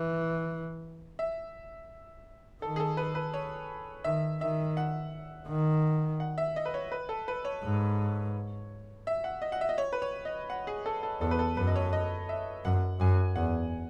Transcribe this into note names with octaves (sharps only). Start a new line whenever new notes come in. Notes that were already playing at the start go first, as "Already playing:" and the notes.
Already playing: E3
E5
D#3 A4
G#4
A4
B4
B4
C#5
D#3 E5
D#3 E5
F#5
D#3
F#5
E5
D#5
B4
C#5
B4
A4
B4
C#5
G#2
E5
F#5
D#5
F#5
E5
D#5
C#5
B4
C#5
D#5
F#5
G#4
A4
A4
E2 A4
B4
A4
F#2 B4
D#5
C#5
D#5
E5
F#2 F#5
F#2 G#5
E2 F#5